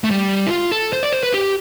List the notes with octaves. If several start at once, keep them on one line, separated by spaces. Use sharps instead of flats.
A3
G3
E4
F4
A4
C5
D5
C5
B4
G4